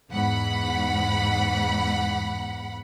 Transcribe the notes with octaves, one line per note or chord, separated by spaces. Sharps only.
E2 G#2 F#5 B5